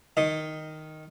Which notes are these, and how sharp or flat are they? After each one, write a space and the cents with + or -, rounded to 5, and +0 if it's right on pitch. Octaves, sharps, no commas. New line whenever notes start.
D#3 +0 D#5 +0